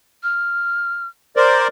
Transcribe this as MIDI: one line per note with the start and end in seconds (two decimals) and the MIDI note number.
0.23 1.07 89
1.37 1.68 70
1.37 1.68 72
1.37 1.68 74
1.37 1.59 84